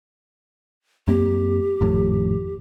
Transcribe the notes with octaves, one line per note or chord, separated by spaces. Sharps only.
F#2 A#3 C4 G4
G#1 F2 A2